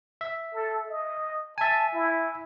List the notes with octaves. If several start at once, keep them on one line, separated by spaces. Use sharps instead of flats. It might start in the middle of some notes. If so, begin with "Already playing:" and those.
E5
A4
D#5
E5 G#5 A5
E4